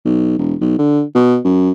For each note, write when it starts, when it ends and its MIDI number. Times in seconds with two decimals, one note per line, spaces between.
0.05 0.38 35
0.38 0.55 28
0.61 0.76 35
0.79 1.03 50
1.15 1.38 47
1.45 1.72 42